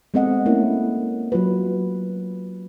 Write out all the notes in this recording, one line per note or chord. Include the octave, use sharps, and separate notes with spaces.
G#3 B3 C4 A4 D#5 F#5
A3 A#3 C#4 E4
F#3 F4 B4